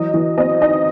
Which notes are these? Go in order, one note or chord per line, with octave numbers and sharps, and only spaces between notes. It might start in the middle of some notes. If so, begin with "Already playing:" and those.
Already playing: E3 F#3 D#5
E3
C4 D#5
D#4 D#5